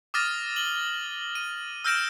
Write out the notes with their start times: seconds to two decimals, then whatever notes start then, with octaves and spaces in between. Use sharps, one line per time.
0.14 D6 D#6 F6 A6 A#6 D#7
0.56 F#7 G7
1.35 D#7
1.84 E6 F6 G6 A#6 D7 E7